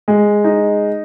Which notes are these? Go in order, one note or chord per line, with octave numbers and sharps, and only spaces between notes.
G#3
D#4